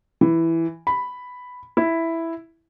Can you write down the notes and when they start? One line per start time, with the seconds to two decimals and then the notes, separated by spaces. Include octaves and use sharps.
0.21 E3
0.87 B5
1.77 E4